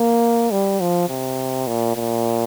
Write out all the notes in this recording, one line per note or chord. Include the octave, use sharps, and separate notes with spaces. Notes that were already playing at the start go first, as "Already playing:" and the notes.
Already playing: A#3
G3
F3
C3
A#2
A#2